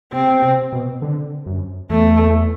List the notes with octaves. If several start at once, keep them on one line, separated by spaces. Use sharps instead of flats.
C3 C4
C3
B2
D3
F#2
E2 A3